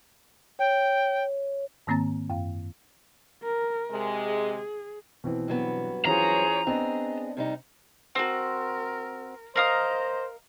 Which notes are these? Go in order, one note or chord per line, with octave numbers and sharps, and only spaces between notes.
C#5 G5
G#2 D#3 A#3 C4 A#5 A6
F#2 F5
A#4
C3 G#3
G#4
B2 E3 C4
G2 F#3 B3
E3 C#4 F4 G#4 C5 C#5 A#5
B3 C4 D4 G#4 D#5
C3 G3 D#4
C4 F#4 A#4
A#4 C5 D#5 F5 A#5 D#6